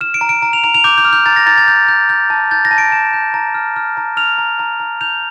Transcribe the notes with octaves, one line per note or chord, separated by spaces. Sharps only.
F6 E7
D7
A#5
D7
A#5
F7
A#5 F7
F7
D6 G6
G6
F6
G6
A#5 A6
A#6
A#5 A6
A6
G6
G6
G6
A5
G6 A6
A#6
A5
D7
A5 E7
G6
A#5
F6
F6
A#5
F6 F7
A#5
A#5
A#5
G6 F7